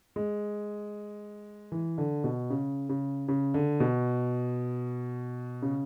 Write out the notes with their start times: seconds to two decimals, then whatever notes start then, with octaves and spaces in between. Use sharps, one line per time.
0.16 G#3
1.72 E3
1.98 D3
2.24 B2
2.50 C#3
2.89 C#3
3.28 C#3
3.54 D3
3.80 B2
5.62 C#3